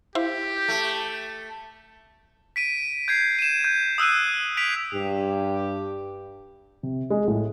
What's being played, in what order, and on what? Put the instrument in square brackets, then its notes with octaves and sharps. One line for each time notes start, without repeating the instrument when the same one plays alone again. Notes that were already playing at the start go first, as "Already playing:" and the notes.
[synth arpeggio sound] E4 C5 F5 [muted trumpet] G4
[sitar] A3
[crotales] B6 D7 D#7
G6 G#6 C7
D#7 E7
G6
D#6 E6 F#6 D#7
B6 D7 F7
[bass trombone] G2 [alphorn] G4
[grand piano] C3
G#3
A2